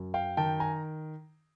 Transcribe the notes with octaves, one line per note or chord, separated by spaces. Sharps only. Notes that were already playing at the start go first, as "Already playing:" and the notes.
Already playing: F#2
F5 G5
D#3 G5 A5
G#5 A#5